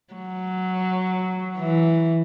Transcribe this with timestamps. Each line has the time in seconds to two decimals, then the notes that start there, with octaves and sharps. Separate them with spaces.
0.14 F#3
1.58 E3